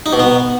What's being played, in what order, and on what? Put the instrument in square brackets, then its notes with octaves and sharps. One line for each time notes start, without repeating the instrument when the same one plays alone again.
[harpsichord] D#4
B2
B3